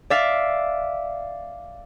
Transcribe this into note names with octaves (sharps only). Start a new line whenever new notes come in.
D5 E5 F5